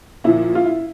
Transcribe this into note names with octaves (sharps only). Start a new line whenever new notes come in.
A#2 F3 E4
F4
E4